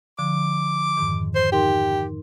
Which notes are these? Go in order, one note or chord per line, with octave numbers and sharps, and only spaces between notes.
D3 F3 D6
F2 G#2 D#3
C5
D#4 G4 A#4 C6